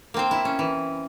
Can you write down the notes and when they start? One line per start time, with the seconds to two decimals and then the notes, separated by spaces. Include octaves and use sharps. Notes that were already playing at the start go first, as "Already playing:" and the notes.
0.14 A#3 C4 C5
0.31 E4
0.45 C#4
0.59 E3